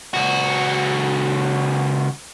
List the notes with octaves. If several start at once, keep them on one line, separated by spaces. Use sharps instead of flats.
C#2 F#4